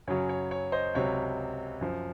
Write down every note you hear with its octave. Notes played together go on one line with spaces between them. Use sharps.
F#2 C#3 F#3 C#5
C#5
C#5
C5 D#5
C#2 C3 F#3 C#5
F#2 F3